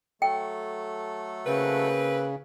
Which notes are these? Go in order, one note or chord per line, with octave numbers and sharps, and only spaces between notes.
F#3 A3 A4 G5
C#3 A#3 C4 B4